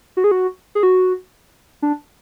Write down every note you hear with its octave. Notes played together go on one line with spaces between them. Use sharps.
F#4
G#4
F#4
G#4
F#4
D4